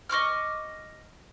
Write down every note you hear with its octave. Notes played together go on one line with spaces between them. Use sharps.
D#5 C#6 D6 F6